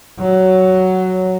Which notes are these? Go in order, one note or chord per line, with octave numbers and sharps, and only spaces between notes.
F#3